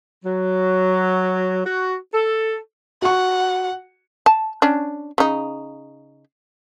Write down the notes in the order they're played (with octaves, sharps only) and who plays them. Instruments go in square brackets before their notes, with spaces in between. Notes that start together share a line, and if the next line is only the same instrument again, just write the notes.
[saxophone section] F#3
F#4
A4
[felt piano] F#4 C#6 [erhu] F#5
[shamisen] A5
C#4 D4
C#3 D#4